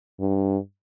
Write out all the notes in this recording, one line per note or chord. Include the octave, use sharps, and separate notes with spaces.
G2